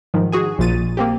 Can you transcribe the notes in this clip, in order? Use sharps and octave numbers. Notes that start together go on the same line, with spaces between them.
G#2 D#3 F3
F#4 G#4 G#5
A#1 A#2 A6 D#7
A#3 C4 G4